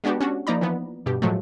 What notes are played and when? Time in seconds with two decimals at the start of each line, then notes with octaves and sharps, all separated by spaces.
0.04 G#3 B3 D4 F#4 G4
0.21 C#4 D4 F#4
0.47 F3 A#3 D#4 D5 A#5 B5
0.61 E3 F3 B3
1.06 G2 B2 G4
1.22 A2 F3 F#3 G#3 A3